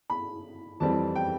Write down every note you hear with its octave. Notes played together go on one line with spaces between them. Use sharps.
B5
F2 E3 G3 C4 A5
G5